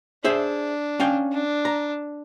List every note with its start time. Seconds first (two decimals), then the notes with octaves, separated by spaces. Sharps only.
0.24 D4 G#4 C5 E5
1.00 C#4 F5 G5
1.32 D4
1.65 A#5